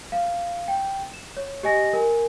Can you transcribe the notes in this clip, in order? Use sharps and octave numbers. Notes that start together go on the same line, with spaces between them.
F5
G5
E7
C#5
G4 D#5 G#5 A#6
A#4 G#5